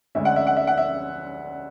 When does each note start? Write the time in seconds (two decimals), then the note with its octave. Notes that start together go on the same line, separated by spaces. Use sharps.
0.15 D2 D3 G#3 C#4 E5
0.25 F#5
0.36 E5
0.47 F#5
0.57 E5
0.67 F#5
0.78 E5